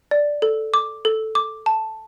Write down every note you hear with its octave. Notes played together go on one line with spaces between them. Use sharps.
D5
A4
D6
A4
D6
A5